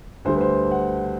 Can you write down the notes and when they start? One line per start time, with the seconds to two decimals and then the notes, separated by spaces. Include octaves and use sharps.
0.25 D2 D3 G3 C5
0.36 B4
0.41 C5
0.72 F#5